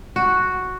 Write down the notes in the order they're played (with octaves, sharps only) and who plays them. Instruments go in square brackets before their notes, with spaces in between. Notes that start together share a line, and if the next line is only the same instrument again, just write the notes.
[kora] F#4